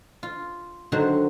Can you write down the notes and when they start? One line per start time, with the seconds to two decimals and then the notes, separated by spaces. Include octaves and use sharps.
0.23 F4
0.92 D3 D#3 F#3 F#4 C5